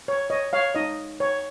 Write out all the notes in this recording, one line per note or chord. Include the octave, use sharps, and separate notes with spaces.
C#5
C#5 D#5
C#5 F5
D#4 D#5
C#5